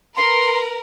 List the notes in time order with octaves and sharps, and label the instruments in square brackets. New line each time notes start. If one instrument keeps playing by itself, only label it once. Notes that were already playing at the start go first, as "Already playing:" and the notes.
[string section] A#4 B4 [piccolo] C6